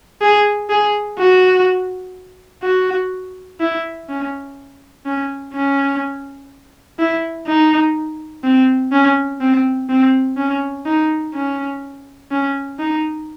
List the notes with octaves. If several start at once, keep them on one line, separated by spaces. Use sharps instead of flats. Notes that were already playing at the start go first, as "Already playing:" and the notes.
G#4
G#4
F#4
F#4
E4
C#4
C#4
C#4
E4
D#4
C4
C#4
C4
C4
C#4
D#4
C#4
C#4
D#4